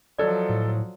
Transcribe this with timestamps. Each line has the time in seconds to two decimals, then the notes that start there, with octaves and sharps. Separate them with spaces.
0.18 F3 F#3 A4 D5 D#5
0.49 A2